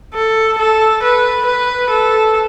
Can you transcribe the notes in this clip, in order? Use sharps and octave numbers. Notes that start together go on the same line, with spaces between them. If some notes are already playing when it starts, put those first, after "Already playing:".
A4
A4
B4
B4
A4